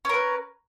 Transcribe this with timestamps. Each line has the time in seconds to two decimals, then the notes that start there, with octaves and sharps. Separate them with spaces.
0.05 C#4
0.09 A#4
0.14 B4